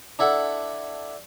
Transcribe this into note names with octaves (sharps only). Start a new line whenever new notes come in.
D4 E4 A4 F#5